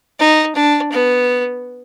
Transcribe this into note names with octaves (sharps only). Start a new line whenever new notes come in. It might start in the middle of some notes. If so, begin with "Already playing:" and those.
D#4
D4
B3